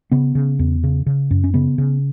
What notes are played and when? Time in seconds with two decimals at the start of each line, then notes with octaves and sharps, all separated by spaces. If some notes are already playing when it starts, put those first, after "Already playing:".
0.12 C#3 B3
0.35 C#3
0.59 E2
0.84 C#3
1.06 C#3
1.31 F#2
1.44 C#4
1.54 C#3 B3
1.78 C#3